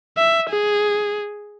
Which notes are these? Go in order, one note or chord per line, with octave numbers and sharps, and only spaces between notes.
E5
G#4